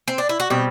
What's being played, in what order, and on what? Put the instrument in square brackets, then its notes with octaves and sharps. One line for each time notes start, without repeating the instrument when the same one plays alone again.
[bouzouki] C4
D4
E4
F#4
[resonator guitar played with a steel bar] B2 G3 C4 [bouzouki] G4